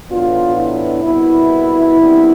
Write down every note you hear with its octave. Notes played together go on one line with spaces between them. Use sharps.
A2 E3 B3 D4 F4
E4
C2 B2 B3 E4
C2 C3 G3 B3 D4